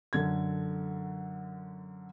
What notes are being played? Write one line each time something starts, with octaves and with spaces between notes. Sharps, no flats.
F#2 D3 A4 G#6